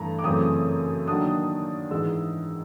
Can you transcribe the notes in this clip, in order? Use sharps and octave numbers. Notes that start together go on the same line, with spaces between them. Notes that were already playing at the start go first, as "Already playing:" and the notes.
Already playing: G2 E3 A3 A5 A#5
D6
F#2 C#3 E3 A3 C4 D#6
D#3 F#3 A#3 D4 D#6
G#2 E3 G#3 E6